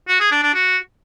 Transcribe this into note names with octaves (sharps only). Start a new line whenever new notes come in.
F#4
G#4
D4
D4
F#4